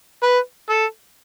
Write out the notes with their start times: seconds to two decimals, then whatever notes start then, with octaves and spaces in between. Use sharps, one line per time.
0.23 B4
0.69 A4